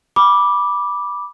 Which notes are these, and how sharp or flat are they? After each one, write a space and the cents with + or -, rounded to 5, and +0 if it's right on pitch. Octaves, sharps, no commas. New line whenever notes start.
B5 -15 D6 +0